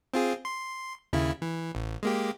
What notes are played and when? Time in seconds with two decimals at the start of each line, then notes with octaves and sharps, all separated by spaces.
0.14 C4 F4 G#4
0.45 C6
1.13 D#2 C#3 E4
1.42 E3
1.75 A1
2.03 G#3 A#3 G4